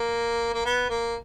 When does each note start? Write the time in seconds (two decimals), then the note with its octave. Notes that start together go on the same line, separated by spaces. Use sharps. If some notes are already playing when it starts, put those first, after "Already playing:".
Already playing: A#3
0.54 A#3
0.65 B3
0.89 A#3